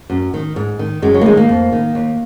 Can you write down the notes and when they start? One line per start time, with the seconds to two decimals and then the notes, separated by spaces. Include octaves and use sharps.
0.10 F#2
0.34 D#3
0.56 G#2
0.79 D#3
1.02 F#2 G#3
1.14 F#3
1.21 A#3
1.26 D#3 G#3
1.37 A#3
1.49 F2
1.72 D#3
1.95 D#2